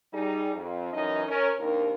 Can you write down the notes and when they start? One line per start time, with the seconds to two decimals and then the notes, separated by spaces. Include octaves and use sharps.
0.14 G3 D#4 G#4
0.55 F2
0.93 F#2 E3 C#4 D#4 D#5
1.27 C#4 A#4
1.59 D#2 C3 D#3 D4 A#4